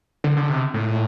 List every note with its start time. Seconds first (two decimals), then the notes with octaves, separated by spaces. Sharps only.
0.24 D3
0.37 D3
0.49 C3
0.74 A2